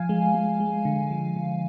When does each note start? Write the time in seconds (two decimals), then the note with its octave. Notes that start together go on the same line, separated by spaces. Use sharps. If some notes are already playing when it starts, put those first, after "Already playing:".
Already playing: F3 F5 G#5
0.09 G#3
0.34 G#3
0.60 G#3
0.85 D3
1.11 F3
1.36 D3